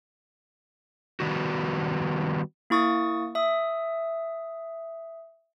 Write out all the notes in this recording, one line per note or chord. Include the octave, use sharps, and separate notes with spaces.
D#3 G3 B3 F#4
A#3 E4 C#6 D#6 A6
E5 D#6